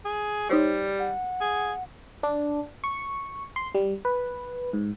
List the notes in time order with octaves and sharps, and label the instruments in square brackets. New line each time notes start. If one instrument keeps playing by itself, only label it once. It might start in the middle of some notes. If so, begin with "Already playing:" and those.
[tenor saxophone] G#4
[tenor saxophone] G3 [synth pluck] D#4 C5 C#5
[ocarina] F#5
[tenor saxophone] G#4
[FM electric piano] D4
C#6
C6
G3
B4
G#2